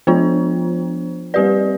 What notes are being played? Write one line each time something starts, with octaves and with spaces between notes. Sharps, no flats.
F3 B3 D4 F4 C5
G3 C4 G4 B4 D5